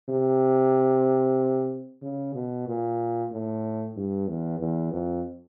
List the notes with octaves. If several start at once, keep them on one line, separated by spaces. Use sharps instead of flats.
C3
C#3
B2
A#2
A2
G2
E2
E2
F2